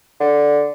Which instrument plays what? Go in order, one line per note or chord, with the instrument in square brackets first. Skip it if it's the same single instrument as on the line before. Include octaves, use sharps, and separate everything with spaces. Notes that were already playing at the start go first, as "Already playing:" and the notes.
[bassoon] D3